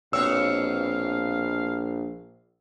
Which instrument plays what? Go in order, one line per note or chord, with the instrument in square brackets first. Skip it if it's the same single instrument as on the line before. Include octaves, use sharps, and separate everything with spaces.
[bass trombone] A#1 [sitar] B2 C4 C#5 [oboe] F5 [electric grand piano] E6